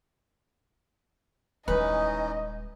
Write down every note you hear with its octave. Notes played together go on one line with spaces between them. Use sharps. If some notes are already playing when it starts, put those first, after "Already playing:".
D#1 E3 G#3 C#4 D#4 B4 D#5